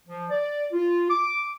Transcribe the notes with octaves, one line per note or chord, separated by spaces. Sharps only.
F3
D5
F4
D6